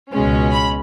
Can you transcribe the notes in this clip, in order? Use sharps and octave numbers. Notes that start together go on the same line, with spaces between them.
C#2 B2 G#3 C#4
B5